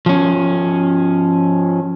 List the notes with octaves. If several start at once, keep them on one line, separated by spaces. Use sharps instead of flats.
F3 C#4